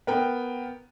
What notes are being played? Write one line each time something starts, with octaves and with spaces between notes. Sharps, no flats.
B3 A#4 G5